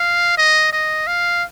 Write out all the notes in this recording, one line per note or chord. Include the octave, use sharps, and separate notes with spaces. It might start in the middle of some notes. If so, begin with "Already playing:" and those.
Already playing: F5
D#5
D#5
F5